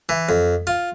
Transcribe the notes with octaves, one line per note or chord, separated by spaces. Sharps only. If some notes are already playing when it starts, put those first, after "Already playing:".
E3
F2
F4